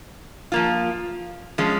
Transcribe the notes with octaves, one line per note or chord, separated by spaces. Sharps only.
F3 A#3 F4
F3 G#3 C#4